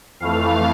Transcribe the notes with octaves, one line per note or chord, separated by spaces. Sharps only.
F2 E3 A3 F5